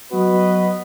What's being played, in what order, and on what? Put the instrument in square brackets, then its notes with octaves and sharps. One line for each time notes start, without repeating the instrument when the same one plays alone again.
[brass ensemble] F#3 B3 F#4 B4 D#5